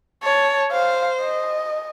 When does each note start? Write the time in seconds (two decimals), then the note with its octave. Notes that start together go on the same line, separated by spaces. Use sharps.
0.23 C#5 A5
0.72 C5 F5
1.21 D#5